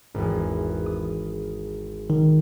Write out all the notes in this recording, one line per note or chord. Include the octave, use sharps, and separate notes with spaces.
G#1 E2
D#6
D#3